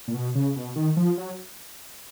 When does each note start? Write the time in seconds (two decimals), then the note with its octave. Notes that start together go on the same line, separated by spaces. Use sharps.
0.08 A#2
0.14 B2
0.35 C#3
0.56 B2
0.76 D#3
0.97 F3
1.17 F#3